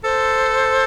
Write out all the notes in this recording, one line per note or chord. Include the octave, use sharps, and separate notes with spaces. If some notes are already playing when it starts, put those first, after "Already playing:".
A4 C5